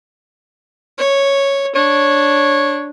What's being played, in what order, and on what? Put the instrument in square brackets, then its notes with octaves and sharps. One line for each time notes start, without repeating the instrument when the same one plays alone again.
[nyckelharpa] C#5
[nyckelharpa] D4 [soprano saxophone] C#5